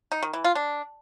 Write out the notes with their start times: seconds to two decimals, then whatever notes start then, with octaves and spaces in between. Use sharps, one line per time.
0.12 D#4
0.23 D#3
0.33 E3
0.44 F4
0.55 D4